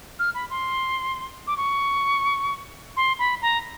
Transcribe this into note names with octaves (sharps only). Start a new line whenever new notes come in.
F6
B5
C6
D6
C#6
C6
B5
A#5